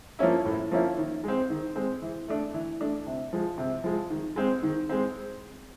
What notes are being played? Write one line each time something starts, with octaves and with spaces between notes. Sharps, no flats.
F3 A#3 C#4 E4
A2
F3 A#3 C#4 E4
D#3
G#3 C4
D#3
G#3 C4
E3
A3 D4
E3
A3 D4
C3
F3 G#3
C3
F3 G#3
D#3
G#3 C4
D#3
G#3 C4